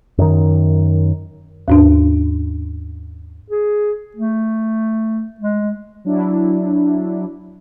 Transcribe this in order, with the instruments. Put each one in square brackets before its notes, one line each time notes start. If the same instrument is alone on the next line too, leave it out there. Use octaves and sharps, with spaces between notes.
[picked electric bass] F#2 D#3
[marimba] D#2 G#2 D4
[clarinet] G#4
A3
G#3
[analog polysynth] F#3 D4 E4